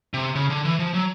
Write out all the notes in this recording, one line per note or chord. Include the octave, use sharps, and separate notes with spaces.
C3
C#3
D3
E3
F3
F#3